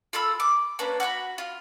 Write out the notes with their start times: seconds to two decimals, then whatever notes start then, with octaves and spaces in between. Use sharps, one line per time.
0.13 F4 A4 B5 E6
0.40 D6
0.79 A#3 C#4 D4 B4
1.00 F#4 F#5 G5 B5
1.38 F4